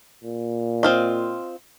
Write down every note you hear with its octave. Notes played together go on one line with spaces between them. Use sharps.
A#2
C4 F4 D#5